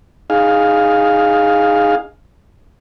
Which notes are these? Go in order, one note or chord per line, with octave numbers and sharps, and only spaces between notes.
D#4 G#4 F5